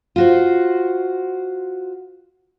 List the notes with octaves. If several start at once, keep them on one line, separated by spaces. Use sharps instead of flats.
F4 F#4 C5